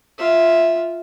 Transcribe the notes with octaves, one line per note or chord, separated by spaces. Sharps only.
F4 E5